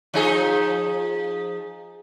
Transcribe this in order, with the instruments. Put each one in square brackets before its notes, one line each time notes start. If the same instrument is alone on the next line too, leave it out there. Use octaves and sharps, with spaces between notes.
[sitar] F3 D#4 G#4